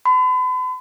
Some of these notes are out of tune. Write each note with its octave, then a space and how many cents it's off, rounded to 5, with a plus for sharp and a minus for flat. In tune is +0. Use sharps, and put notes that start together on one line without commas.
B5 +45